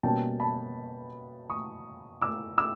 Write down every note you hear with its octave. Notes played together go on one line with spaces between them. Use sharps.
B2 G3 A#3 C#4 G5 A5
A5 B5
C#6 D#6
D6 E6
D6 E6